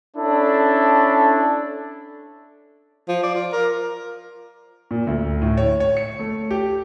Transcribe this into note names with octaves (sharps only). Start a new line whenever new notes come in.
C#4 D4 E4 A4
F3
D5
F4
A#4
A#2
D2
A2
C#5
C#5
C#7
A3
G4